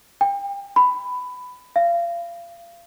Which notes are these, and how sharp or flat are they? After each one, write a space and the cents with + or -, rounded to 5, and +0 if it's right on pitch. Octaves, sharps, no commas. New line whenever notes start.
G5 +35
B5 +15
F5 -30